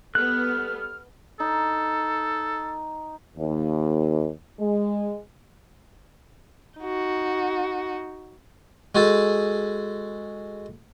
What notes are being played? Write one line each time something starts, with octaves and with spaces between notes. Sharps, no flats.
G3 B3 A4 F6 F#6
D#4 A4
D#2
G#3
D#4 F#4
G#3 F#4 G#4 A4 A5